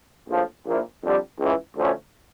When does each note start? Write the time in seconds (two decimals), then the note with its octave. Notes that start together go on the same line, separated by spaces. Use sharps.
0.28 A#1 A2 F3
0.65 A#1 A#2 F3 A#3 E4
1.03 F2 D3 G3
1.39 C#2 C#3 E3
1.76 D2 D3 F3 A3 C#4